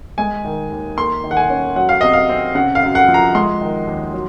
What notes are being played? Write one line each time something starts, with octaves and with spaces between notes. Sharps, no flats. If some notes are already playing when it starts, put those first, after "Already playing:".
G#3 G#5
D#3
D#2
A#3 C6
D#3
F#5
G#5
C#4
F#3 F#5
F5
C3 D#5
F5
C4
C#3 F#5
F5
F#2
F#5
F3
A#5
G#3 C6
D#3
D#2
F#3